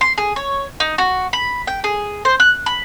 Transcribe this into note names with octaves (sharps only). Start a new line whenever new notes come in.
C6
G#4
C#5
D#4
F#4
B5
G5
G#4
C5
F#6
B5